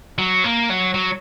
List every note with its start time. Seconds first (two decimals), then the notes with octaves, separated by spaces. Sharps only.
0.18 F#3
0.44 A#3
0.70 F#3
0.94 F#3